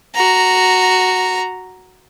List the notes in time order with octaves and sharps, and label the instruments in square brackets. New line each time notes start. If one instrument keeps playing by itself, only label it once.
[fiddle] F#4 A#5